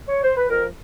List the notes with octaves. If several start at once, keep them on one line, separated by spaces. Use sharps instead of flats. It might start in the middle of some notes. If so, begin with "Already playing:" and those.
C#5
C5
B4
F2 A#4